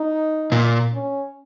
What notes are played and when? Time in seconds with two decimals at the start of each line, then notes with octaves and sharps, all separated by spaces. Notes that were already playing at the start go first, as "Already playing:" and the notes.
Already playing: D#4
0.52 A#2
0.94 C#4